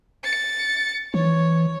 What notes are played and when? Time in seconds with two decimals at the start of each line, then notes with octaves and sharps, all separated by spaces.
0.24 A6 C#7
1.14 E3 C#5